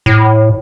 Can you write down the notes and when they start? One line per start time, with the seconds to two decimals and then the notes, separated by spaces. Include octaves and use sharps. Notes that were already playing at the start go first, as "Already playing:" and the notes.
0.06 A2